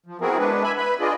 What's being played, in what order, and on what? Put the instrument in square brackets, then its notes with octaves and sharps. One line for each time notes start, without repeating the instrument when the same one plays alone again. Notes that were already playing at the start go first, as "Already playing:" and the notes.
[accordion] F3
B3 C4 E4 F#4 G#4 A#4
G#3 B3 D4 B4
E5 G#5 B5
B4 B5
D4 F4 G#4 D5 D#5